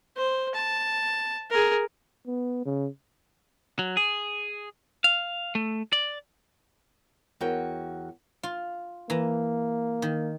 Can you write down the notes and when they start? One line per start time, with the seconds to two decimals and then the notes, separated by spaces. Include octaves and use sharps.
0.17 C5
0.55 A5
1.51 G#4 A#4
2.27 B3
2.66 C#3
3.79 F#3
3.97 G#4
5.04 F5
5.55 A3
5.93 D5
7.41 E2 F#4 A#4 C#5 G5
8.43 F4
9.10 E3 A#3 A#5
10.02 D#3